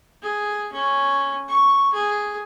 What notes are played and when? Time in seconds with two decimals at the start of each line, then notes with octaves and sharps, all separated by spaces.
0.22 G#4
0.72 C#4
1.48 C#6
1.93 G#4